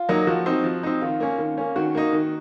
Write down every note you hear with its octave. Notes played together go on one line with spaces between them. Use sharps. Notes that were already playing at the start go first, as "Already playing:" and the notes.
Already playing: F4
F#3 A#3 D#4
F3 F#4
C4 D#4
F3
C4 D#4
D#3 F4
A#3 C#4
D#3
A#3 C#4
D#3 F#4
A#3 D#4
D#3